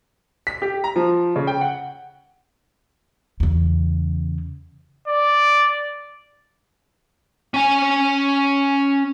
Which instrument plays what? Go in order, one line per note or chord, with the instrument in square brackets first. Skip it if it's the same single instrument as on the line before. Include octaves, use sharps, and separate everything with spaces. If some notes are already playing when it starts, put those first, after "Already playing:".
[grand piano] B6
G4
A#5
F3
C#3
G5
F#5
[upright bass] E2 C#3
[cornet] D5
[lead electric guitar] C#4 G#5